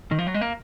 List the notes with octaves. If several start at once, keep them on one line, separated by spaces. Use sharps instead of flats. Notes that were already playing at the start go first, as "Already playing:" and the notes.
D#3
F3
F#3
G#3
A#3